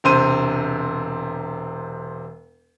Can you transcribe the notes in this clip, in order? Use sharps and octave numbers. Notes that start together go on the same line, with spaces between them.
E1 C3 C5 D#7